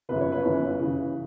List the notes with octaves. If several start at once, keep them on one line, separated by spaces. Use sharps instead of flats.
G1 F#2 C#3 B4
C#5
B4
G1 F#2 E3
C#3 E3